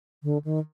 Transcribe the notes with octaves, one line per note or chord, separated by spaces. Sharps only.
D3
D#3